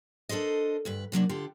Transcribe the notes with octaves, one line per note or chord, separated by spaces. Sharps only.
D4 A4 A#4 C5 D#5
D2 G2 B4
C3 F#3 A#3 D4
D3 F4 G4